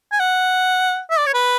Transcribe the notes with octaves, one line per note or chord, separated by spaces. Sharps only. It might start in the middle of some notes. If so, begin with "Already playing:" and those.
G#5
F#5
E5
D5
C#5
B4